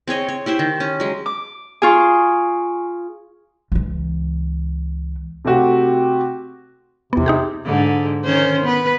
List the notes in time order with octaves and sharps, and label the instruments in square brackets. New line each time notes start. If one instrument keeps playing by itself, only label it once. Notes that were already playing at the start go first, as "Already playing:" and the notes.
[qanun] C4 G#4 C#5 D#5
C#5
E4 G4 C5 E5
D#3
C#4
F#3 G#3
[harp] D6
[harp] F4 G#4 [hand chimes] G#5 C#6
[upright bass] C#2 E3
[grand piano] C3 A3 C4 F#4 G4
[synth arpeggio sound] E2 B3 [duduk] C3
[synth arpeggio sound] D#4 G4 G#4
[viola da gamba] G#2 D3
D#3 C#4 C5
B3 B4